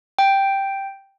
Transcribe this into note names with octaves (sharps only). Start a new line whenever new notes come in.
G5